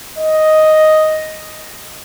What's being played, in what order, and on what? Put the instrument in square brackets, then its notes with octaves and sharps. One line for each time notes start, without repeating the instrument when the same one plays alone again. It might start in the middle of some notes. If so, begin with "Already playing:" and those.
[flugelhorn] D#5